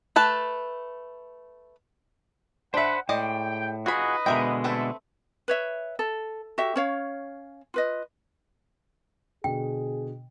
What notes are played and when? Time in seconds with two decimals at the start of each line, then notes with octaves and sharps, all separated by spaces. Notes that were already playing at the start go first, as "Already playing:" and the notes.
0.16 A3 B4 A5
2.74 D4 C5 E5 F#5 B5
3.09 A2 G#3 D5 D#5 G5
3.86 D#4 F4 F#4 G#4 B4 D#5 B5
4.26 B2 D3 G#3 A#4 E5 G5
4.64 A3 C4 E4 A4 B4 E5
5.48 B4 C#5 E5
5.99 A4
6.58 F#4 G4 A4 E5
6.76 C#4 C#5 F5
7.74 F4 B4 D#5
9.44 B2 D3 G#4 G5